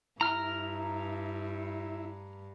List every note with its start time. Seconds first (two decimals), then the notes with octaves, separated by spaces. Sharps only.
0.21 G2 E4 A#5 F6